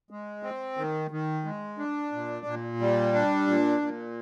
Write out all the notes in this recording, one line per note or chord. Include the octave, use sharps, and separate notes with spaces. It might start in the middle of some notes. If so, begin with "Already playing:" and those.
G#3
C4
D#3
D#3
G#3
D4
A#2
A#2
G3
D4
A#2
A#2